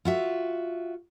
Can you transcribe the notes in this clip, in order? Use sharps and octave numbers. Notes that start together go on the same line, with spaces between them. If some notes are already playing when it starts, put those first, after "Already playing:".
F4 F#4 E5